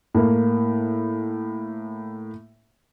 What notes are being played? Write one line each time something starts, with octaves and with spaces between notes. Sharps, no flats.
A2 A#3